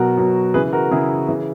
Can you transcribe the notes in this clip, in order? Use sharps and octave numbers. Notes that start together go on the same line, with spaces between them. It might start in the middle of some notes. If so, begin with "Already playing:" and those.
Already playing: B2 F#3 F#4 A#4
B2 F#3
C#3 E3 G#4 B4
F#4 A#4
C#3 E3 E4 G#4
C#3 E3